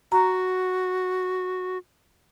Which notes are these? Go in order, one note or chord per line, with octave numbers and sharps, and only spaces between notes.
F#4 A#5